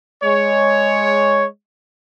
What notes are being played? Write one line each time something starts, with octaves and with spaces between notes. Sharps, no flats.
G#3 C#5